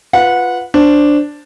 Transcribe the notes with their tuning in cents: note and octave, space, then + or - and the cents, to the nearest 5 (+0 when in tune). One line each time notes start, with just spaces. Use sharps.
F4 +0 B4 +0 F#5 -20
D4 +0 C5 +0